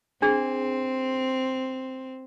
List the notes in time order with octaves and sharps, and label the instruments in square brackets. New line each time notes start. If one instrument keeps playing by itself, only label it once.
[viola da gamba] C4 [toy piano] D4 G#4